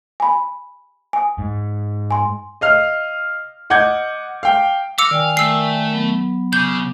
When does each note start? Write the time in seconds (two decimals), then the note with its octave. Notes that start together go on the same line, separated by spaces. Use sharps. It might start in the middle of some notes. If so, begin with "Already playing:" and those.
0.20 G#5 B5
1.13 G#5 D#6
1.38 G#2
2.11 G#5 C6
2.61 D#5 F5 F6
3.70 D#5 F#5 D6 G6 G#6
4.43 F5 G5
4.98 F5 D6 E6 A#6 C#7
5.11 D#3 D5 G5 G#5
5.37 A3 E6 C7
5.93 F#3 B3
6.53 C#3 G#4 D6 G6